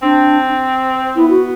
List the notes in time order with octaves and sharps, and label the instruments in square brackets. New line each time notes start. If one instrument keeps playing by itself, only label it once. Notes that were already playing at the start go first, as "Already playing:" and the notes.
[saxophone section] C4 [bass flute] D4
[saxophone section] B3 [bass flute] E4
[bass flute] F#4